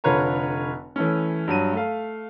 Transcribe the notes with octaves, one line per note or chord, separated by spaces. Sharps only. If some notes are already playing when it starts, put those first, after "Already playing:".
F1 D3 F4 B4 C#5 A#5
E3 A3 C#4
G2 F#3 D#7
A3 F5